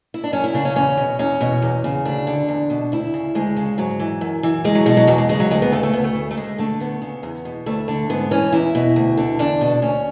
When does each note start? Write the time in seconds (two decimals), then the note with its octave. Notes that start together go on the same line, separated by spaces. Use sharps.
0.14 E4
0.24 D4
0.33 F#2 C#4
0.44 E4
0.54 C#3 D4
0.65 C#4
0.75 E2 C#4
0.97 B2
1.19 E2 C#4
1.41 B2
1.62 E2
1.84 C#3
2.05 D2 D4
2.27 D3
2.49 E2
2.70 B2
2.92 D2 E4
3.14 C#3
3.35 D2 G#3
3.56 C#3
3.78 G#2 F#3
4.00 E3
4.21 F#2
4.43 E3
4.64 E2 G#3
4.75 F#3
4.86 B2 G#3
4.97 F#3
5.07 E2 F#3
5.18 G#3
5.29 C#3 G#3
5.40 F#3
5.51 D2 G#3
5.62 B3
5.72 C#3 A3
5.83 A3
5.93 D2 B3
6.04 A3
6.16 C#3
6.31 A3
6.37 D2 G#3
6.58 D3 A3
6.80 D2 B3
7.02 C#3
7.23 E2
7.45 B2
7.66 D2 A3
7.88 D3
8.10 G#2 B3
8.31 E3 C#4
8.52 E2 E4
8.75 B2
8.96 D2
9.17 D3
9.39 E2 D4
9.61 B2
9.82 D2 C#4